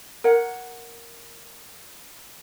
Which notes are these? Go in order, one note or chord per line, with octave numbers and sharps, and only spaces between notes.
A#4 C#5 F#5